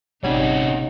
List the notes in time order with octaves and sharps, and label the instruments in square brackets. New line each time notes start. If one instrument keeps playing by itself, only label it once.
[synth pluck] G#1 G3 G#6 [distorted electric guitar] C3 C#4 [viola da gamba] D#4 [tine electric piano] C#5 F#5